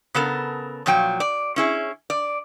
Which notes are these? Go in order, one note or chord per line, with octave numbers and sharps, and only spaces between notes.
C#3 B3 A4 A#4
A#2 F3 F#3 G5
D5
C#4 E4 G#4
D5